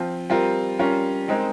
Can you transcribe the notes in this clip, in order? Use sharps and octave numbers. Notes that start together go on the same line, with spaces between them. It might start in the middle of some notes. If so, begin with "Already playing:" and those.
Already playing: F3 C4 F4
G3 C4 F4 A#4
G3 C#4 F4 A#4
G#3 C4 D#4 A#4